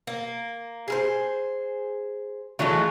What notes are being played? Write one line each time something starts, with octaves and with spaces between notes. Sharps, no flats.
A#3
G#4 A#4 C5
E3 F#3 G#3 A3 F4